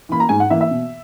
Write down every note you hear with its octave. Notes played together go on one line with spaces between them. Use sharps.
E3 A#3 B5
A#5
G#2 G#5
F#5
E3 A#3 E5
E5
B2